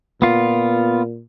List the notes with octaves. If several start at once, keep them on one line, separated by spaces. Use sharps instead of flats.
A#2 B3 F4